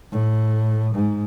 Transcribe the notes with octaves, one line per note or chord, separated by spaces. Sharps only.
A2
G#2